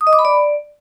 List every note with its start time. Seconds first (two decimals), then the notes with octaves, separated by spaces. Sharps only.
0.01 D#6
0.07 D#5
0.13 D6
0.19 B5
0.25 D5